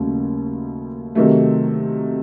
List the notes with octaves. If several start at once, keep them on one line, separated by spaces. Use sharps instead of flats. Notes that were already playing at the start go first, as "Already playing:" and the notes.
Already playing: D#2 C#3 F#3 A3
C3 D#3 F#3 A3